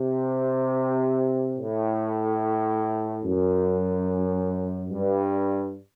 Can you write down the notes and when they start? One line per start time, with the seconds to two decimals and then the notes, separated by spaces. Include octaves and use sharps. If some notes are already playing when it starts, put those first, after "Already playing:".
Already playing: C3
1.58 A2
3.24 F#2
4.90 G2